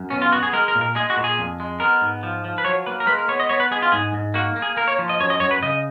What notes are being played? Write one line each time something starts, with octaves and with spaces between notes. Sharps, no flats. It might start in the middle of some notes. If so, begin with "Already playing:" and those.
Already playing: F#2
B2 C#4
F4
B3 F#4
G#4
G#3 A#4
A#4
A#2
A#4
G#3 G#4
F#4
A#2
G#4
F2
G#3
B3 A#4
G#2
F3
F3
B4
F#3 C#5
A#3 B4
A#4
G#3 B4
A#4
B3 C#5
D#5
B3 C#5
B4
G#3 G#4
F4
G#2 G#4
G#2
A#3 F#4
A#3
G#4
A#3 A#4
C#5
F3
D#5
F#2 C#5
D#5
F#2 C#5
B4
C#3 D#5